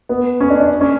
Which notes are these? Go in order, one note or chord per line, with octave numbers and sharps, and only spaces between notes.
B3
C#4
D4
D4
C#4